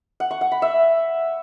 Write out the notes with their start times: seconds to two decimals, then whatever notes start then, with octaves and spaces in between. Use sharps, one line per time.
0.20 F#5
0.31 C#6
0.41 F#5
0.52 B5
0.62 E5